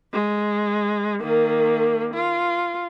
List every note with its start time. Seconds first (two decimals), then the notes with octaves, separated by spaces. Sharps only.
0.13 G#3
1.20 D#3 A#3
2.14 F4